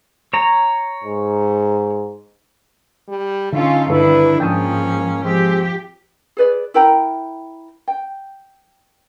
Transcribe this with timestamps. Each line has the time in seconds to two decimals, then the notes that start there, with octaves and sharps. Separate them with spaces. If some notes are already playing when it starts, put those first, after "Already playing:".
0.33 C#5 A#5
1.04 G#2
3.08 G3
3.53 D3 C#4 D#4 F4 A4
3.89 G2 D3 D#3 D4 E4 A4 B4 C#5
4.40 G#2 F3 A#3 C#4 G5 A5 D#6
5.24 F3 G#3 C4 G4
6.37 G#4 B4 D5
6.74 E4 A#4 G5 A#5
7.88 G5